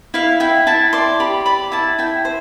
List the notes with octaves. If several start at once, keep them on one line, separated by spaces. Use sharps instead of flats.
E4 F5
E4 G5
E4 A5
D5 C6
G4 B5
D5 B5
E4 A5
E4 G5
C5